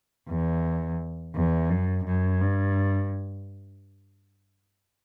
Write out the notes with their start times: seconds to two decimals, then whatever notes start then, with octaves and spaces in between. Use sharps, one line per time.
0.28 E2
1.35 E2
1.70 F#2
2.05 F#2
2.40 G2